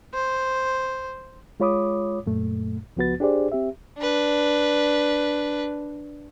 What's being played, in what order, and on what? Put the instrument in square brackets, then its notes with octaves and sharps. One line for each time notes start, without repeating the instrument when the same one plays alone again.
[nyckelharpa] C5
[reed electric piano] G#3 F4 C#5 B5 D6 D#6
F#2 A#2 A3
C#2 F3 B3 F#4 B4 A6
D4 G4 G#4 C5 D5
C4 G4 E5
[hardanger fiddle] D4 B4